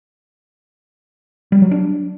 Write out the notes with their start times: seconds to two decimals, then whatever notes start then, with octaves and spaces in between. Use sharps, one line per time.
1.52 G3
1.62 F#3
1.71 D4